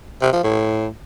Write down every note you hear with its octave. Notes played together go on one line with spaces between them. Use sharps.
C3
F3
A2